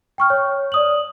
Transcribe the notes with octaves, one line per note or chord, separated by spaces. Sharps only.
G5 C#6 F6
C#5
D5 D#6 F#7